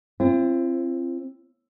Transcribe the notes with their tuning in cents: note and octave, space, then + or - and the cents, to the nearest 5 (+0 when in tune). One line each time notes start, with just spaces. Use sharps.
C4 +20 F4 -45